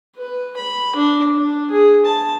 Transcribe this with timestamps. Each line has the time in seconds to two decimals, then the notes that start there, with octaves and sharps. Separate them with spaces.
0.17 B4
0.57 B5
0.96 D4
1.35 D4
1.71 G#4
2.06 A5